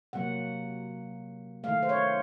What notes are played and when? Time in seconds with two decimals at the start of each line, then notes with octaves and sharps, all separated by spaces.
0.13 C3 F#3 A#3 F#5
1.64 D#3 A3 F5
1.83 C5
1.89 C#5